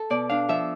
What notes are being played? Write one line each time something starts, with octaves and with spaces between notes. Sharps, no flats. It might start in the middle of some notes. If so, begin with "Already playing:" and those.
Already playing: A4
B2 D5
D4 F5
F3 E5